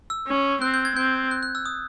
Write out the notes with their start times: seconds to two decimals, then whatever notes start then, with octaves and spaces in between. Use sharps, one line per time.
0.10 E6
0.27 C#4
0.62 C4 F#6
0.74 G6
0.85 G#6
0.96 C4 G6
1.31 F#6
1.43 F#6
1.55 E6
1.66 D#6